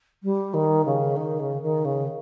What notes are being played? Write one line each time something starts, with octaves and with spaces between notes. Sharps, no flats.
G3
D#3
C#3
D#3
C#3
D#3
C#3